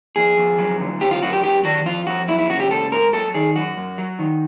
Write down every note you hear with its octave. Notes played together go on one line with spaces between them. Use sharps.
F2 G#4
F2
F#3
D3
F#2 G4
F4
F#2 F#4
G4
F#3 G4
D#3 F#4
F2 F4
F2 F#4
F#3 E4
E4
C#3 F#4
G4
G#2 A4
G#2 A#4
F#3 A4
D#3 G#4
F#2 F#4
F#2
F#3
D#3